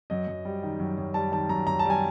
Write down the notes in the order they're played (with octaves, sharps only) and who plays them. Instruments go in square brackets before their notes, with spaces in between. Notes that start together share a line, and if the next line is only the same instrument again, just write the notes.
[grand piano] F#2 D#5
F#2
G3
D#3
F#2
F#2
G3 A5
D#3 A5
F#2 A#5
F#2 A#5
A5
G3 G#5